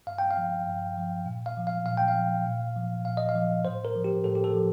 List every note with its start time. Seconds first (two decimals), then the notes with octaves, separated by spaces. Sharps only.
0.07 G2 F5
0.18 G5
0.31 F5
0.37 F3
0.67 G2
0.97 F3
1.26 A#2
1.46 F5
1.57 F3
1.67 F5
1.86 A#2 F5
1.98 G5
2.08 F5
2.16 F3
2.47 A#2
2.76 F3
3.05 A#2 F5
3.17 D#5
3.29 F5
3.35 F3
3.65 A2 C5
3.85 A#4
3.96 F3
4.04 G4
4.24 A2 A4
4.35 G4
4.44 A4
4.54 F3